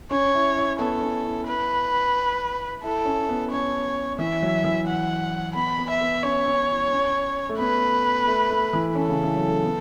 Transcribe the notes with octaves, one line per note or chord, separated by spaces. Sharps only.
C#4 C#5
E4
E4
B3 A4
C#4
E4
B4
E4 A4
C#4
B3
C#4 C#5
E3 E5
F#3
E3
F#5
B3 B5
B3
E5
B3
C#4 C#5
C#4
E4
C#4
A3
B3 B4
A3
A3
E3
C#4 A4
C#3
E3
F#3
A3
B3